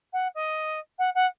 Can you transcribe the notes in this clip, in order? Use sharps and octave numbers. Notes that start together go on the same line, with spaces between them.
F#5
D#5
F#5
F#5